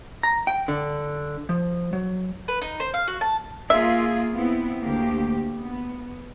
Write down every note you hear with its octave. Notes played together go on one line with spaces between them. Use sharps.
A#5
G5
D3
F3
F#3
B4
D#4
C5
F5
F#4
A5
A#3 F4 G#4 E5
B3 C4 E4
D2 A#3 G4
B3